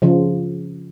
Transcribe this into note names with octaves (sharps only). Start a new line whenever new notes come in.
C#3 F3